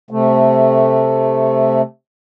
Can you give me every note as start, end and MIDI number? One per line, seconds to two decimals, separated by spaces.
0.11 1.82 48
0.11 1.82 57